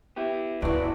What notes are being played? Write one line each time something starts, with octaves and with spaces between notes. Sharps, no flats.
B3 E4 G4
G1 D2 C#3 E4 F#4 B4 D5